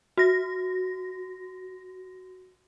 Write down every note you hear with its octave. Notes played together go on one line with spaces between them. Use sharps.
F#4 A#6